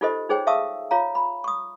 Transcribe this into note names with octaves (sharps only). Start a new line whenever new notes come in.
D#4 F4 G4 A4 C5 D#5
D#4 G#4 C5 C#5 G5
E5 F5 A5 C#6 D#6 E6
F4 C#5 F5 A#5
B5
C#6 D#6